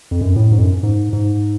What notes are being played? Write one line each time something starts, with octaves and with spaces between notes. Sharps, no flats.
F2
F#2
A2
G#2
F2
F#2
G#2
G#2